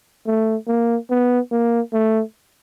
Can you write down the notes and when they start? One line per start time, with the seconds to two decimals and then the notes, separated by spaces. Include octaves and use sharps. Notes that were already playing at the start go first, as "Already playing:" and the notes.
0.27 A3
0.68 A#3
1.10 B3
1.52 A#3
1.93 A3